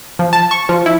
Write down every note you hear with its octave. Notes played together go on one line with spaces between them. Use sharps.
F3
A5
C#6
F3
E4